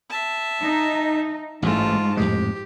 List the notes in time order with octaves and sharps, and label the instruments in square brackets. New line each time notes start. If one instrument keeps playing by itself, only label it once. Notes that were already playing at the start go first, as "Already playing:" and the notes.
[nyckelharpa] E5 A5
[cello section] D#4
[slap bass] A1 A3 [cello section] G#2 [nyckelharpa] F4 A5
[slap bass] F2 A2 G#3 [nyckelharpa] G4